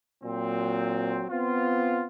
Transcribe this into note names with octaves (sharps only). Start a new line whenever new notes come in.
A#2 F#3 C4
B3 C4 F4